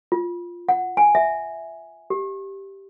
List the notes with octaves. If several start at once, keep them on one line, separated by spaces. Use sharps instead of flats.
F4
F#5
G#5
E5
G4